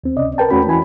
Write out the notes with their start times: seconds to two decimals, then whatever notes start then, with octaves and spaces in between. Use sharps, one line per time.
0.04 D#2 C4
0.17 C#2 C3 C#4 D5 D#5
0.38 A#4 B4 G5 A5
0.51 E2 A3 C#4 F#4 B5
0.67 E3 E4 G#5 B5